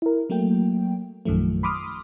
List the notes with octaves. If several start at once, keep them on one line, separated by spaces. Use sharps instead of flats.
E4 A#4
F#3 A3 A#3 G5
A#1 F#2 D#3 F3 A3
B5 C6 D6 D#6 F6